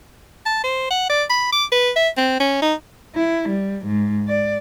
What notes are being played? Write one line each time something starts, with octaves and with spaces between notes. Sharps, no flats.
A5
C5
F#5
D5
B5
D6
B4
E5
C4
C#4
D#4
E4
G3
G#2
D5